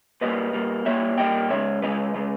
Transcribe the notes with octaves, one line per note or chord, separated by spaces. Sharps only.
A#2 G3 A#3 B4 D#5
A#2 G3 A#3
A#2 G3 A#3 C#5 E5
A#2 G3 A#3 D#5 G5
C#3 G#3 C#5 E5
C#3 G#3 B4 D#5
C#3 G#3